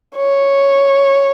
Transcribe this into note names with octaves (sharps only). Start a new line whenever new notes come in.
C#5